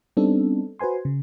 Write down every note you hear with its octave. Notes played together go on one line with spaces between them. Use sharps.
G3 B3 C4 D4 D#4 A4
F#4 B4 C5 G#5 C6
C#3